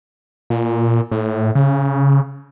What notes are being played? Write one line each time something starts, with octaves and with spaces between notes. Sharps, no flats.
A#2
A2
C#3